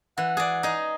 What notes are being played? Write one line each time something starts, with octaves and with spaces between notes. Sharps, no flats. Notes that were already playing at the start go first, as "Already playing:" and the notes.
E3 F#5
G#4 D5
D#4 G#4